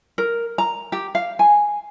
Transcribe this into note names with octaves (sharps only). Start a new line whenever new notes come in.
A#4
A#5
G4
F5
G#5